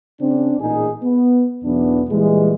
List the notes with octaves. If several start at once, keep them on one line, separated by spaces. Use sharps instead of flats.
C#3 C4 D4
A1 A#2 D#4 G#4
B3
B1 E2 E3 B3 D4
A#2 E3 G3 G#3